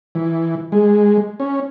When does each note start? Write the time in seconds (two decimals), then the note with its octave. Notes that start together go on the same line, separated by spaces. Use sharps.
0.15 E3
0.72 G#3
1.40 C#4